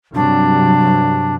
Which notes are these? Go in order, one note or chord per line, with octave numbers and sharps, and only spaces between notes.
G2 C3 F#3 D4